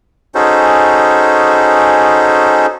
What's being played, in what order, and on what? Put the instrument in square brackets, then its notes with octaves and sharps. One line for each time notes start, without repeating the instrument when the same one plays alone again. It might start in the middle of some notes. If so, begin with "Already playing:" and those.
[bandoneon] C#4 D#4 F#4 G#4 A4 C5